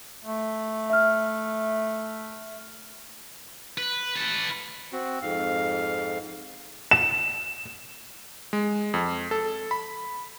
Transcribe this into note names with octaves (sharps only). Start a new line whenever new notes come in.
A3
E5 F6
B4
A4 B4
C4 F#4
F2 G#2 F5
E7
G#3
F2
A4
B5